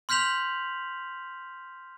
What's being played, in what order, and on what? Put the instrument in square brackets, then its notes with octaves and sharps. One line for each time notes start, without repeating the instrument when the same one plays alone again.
[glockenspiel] C6 F6 G6 B6 F7 F#7